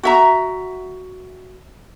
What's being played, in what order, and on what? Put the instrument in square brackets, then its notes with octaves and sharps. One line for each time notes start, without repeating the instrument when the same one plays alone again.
[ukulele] F#4 E5 A#5